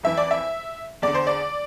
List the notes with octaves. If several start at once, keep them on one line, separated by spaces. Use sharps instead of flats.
F2 E3 E5
D5
E5
E2 D3 D5
C5
D5